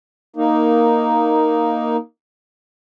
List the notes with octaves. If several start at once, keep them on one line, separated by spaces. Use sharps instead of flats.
A#3 D#4